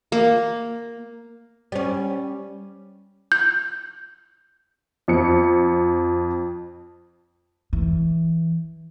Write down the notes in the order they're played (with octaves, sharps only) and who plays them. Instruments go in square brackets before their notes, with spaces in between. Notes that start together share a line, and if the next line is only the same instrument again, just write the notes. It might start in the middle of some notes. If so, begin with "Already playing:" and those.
[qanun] A#3
[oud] G3 C#4
[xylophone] G6
[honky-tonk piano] F2 C#7
[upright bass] E3